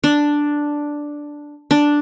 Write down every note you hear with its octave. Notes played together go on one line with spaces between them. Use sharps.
D4
D4